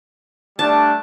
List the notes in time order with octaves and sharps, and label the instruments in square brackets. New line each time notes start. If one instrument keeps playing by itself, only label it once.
[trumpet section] G3 A3 D4 [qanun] A5